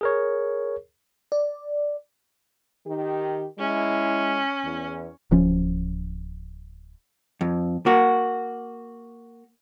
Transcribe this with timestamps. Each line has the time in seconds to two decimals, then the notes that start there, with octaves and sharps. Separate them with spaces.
0.01 G#4 A#4 C#5
1.32 D5
2.86 D#3 G4
3.59 G#3 C#4 E4
4.63 E2
5.31 D1 F3 C#4
7.41 F2
7.86 A#3 F#4